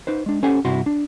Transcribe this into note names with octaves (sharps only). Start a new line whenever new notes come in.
D#4 B4 C5
G#3 D4
C#4 G4 A4 C5 F#5 G#5
C2 G2 C3 E4 F#4 C6
D4